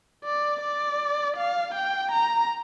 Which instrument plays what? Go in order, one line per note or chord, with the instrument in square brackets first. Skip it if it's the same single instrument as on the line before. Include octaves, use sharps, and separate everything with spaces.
[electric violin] D5
D5
F5
G5
A#5